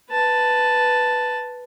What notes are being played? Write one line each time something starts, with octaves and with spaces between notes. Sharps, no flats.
B4 A5